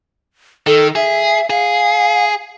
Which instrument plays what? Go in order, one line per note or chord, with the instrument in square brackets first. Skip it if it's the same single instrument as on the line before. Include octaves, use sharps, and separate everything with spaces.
[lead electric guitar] D#3 [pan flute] A4
[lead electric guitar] G#4 [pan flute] E5
[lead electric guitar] G#4 [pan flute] F5